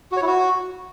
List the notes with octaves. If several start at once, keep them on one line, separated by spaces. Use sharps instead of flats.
F#4
C#5
E4
F#4